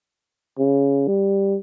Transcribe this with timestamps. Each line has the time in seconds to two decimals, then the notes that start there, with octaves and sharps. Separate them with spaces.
0.58 C#3
1.08 G3